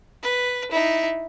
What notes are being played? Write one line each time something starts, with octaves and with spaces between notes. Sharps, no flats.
B4
D#4 E4